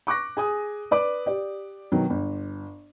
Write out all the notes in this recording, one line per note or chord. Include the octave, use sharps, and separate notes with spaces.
C#6 D6 F#6 A#6
G#4 G#5 D#6
B4 D5 D6
G4 D5
B2 D#3 F#3
G1